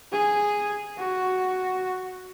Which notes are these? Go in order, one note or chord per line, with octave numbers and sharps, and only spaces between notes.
G#4
F#4